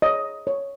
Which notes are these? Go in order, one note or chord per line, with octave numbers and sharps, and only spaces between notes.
C#5 D#5
C#5